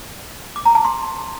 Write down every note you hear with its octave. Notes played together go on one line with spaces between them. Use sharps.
D6
A#5
A5
C6